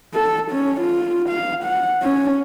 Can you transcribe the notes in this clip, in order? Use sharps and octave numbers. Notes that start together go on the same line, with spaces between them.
A4
C#4
F4
F5
F#5
C#4